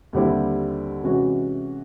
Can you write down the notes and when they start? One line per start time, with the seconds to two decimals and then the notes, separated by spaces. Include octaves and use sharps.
0.13 D#2 D3 G3 C4 E4
1.04 C3 E3 G#3 C#4 F#4